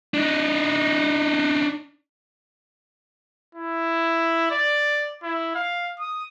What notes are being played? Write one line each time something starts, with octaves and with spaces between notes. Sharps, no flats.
D4 D#4
E4
D5
E4
F5
D#6